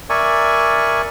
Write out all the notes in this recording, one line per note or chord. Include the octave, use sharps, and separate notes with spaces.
A#4 D5 E5 G#5 C#6